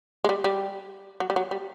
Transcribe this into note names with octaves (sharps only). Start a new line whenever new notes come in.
G#3
G3
G3
F#3
G3
F#3
G3